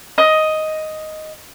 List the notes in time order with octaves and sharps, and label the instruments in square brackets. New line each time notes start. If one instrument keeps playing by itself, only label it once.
[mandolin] D#5